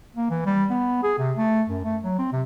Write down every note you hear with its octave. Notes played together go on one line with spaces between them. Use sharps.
A#3
E3
G3
B3
G#4
C3
A3
F#2
A3
F#3
C4
C3